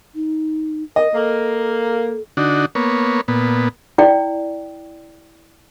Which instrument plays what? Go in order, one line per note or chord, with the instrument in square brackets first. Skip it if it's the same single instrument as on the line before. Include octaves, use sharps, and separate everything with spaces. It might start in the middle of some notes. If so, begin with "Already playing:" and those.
[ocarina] D#4
[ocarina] A#4 [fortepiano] D#5
[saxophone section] A#3 [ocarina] A4
[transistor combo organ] D3 D4 D#4 F#4
A#3 B3 C#5
A#2 B3
[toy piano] E4 D5 G5